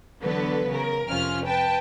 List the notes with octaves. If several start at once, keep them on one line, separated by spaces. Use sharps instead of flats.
D3 E3 F#3 B3 A4 B4
C#3 A#4
F2 C3 C#4 F4 F6
B4 G5 A5